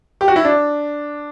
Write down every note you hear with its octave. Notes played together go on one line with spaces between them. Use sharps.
G4
F#4
E4
D4